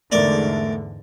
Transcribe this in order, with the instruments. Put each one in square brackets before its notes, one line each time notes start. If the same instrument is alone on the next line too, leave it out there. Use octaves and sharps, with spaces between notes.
[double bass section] E2 G#2 D3 [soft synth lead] A3 [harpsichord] A#4 D5